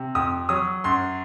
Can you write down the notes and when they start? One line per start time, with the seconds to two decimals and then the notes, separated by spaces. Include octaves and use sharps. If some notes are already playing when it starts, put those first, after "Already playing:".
Already playing: C3
0.15 F2 D#6
0.49 F#3 D#6
0.84 F#2 C6